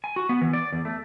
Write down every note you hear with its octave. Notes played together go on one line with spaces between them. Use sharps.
G#5
F#4
B3
E3
D5
E2
A3